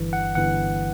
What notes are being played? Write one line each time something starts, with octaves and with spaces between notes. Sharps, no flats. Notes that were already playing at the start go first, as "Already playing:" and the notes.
Already playing: G1 G2 E3
F#5
G1 G2 E3 F#5